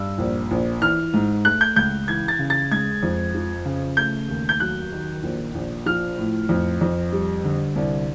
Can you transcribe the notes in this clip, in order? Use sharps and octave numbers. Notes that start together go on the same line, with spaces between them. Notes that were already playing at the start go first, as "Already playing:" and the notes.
Already playing: G2 E6
A#1
A#1
E3 F6
G#2
A3 F#6
G6
C#2 G6
E3 G#6
A6
C#3
A6
G#3 G#6
F2
F3
C#3
A3 G6
D#2
G6
F#3 F#6
D#3
A#1
A#1
F3 F6
A2
F2
F2
G3
D3
C2